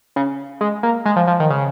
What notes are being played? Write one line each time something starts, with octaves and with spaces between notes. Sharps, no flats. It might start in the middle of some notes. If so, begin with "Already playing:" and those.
C#3
G#3
A#3
G#3
F3
F3
D#3
C#3